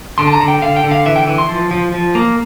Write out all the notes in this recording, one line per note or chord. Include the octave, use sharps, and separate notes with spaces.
D3 C6
A5
A#5
D3
G5
D3 F5
G5
D3
F5
E3 E5
G5
E3
C6
F3
F3
F3
A#3